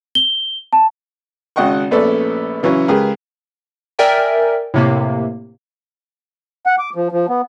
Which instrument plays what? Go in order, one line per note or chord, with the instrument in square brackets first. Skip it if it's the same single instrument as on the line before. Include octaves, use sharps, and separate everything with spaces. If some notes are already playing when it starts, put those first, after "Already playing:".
[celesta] G7
A5
[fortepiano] G#1 C#3 D#5 F#5 G5 C#6
A#1 A3 B3 C#4 A4 D5
C#3 E3 F#3 C#4
C#2 G4 G#4 A#4 B4
[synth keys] A#4 D5 E5 G5 G#5
A2 C3 A#3
[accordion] F#5
D6
F3
F3
B3